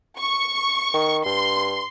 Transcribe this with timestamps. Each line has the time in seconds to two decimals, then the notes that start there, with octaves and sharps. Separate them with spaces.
0.18 C#6
0.94 D#3
1.25 G2 C6